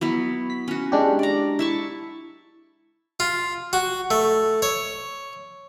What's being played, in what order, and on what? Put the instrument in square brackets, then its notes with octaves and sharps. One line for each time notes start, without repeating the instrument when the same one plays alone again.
[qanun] F#3 B3 E4
[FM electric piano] B6
[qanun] C#4 F#4
[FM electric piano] G#3 D4 G4
[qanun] D5 A#5
E4 A5 C#6
[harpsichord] F4
F#4
A3
C#5